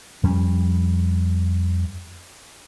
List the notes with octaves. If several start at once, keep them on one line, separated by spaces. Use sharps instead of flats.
F2 G3 C#4